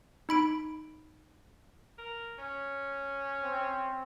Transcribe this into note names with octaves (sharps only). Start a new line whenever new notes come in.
D#4 B5 D7
A#4
C#4
C4